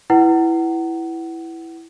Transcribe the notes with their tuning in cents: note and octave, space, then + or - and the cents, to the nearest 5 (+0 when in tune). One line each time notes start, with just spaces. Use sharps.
E4 +0 B4 +0 F#5 +25